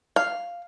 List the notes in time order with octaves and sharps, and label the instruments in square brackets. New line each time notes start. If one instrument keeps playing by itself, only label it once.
[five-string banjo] F5